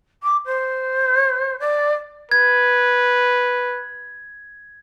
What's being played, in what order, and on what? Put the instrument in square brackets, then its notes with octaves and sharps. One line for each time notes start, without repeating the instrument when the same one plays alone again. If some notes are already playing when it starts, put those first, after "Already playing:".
[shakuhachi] D6
C5
D5
[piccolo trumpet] B4 [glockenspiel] G#6